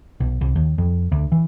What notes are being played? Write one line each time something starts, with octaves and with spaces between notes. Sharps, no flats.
B1
C2
D#2
F2
D2
E3